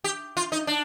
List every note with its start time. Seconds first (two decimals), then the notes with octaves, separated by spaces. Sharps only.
0.04 G4
0.37 F4
0.52 D#4
0.67 D4